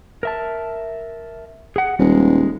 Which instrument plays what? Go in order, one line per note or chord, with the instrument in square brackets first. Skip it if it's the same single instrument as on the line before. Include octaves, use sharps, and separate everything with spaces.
[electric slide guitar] A#4 E5 A5
G#4 F#5
[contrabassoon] D#1 [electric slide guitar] G3 G#3